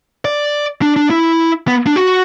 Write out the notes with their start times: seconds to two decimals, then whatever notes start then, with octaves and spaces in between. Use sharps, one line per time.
0.25 D5
0.82 D4
0.96 D4
1.10 E4
1.68 B3
1.87 D4
1.96 F#4